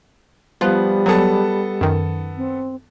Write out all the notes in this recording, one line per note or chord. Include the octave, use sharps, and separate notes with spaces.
F3 G3 B3 F4 F#6
F#3 B3 G#4 A4 A5
F#2 D#3
C4